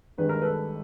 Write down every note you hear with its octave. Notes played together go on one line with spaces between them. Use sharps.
G#1 G2 D#3 G#3 B4
A#4
A4 B4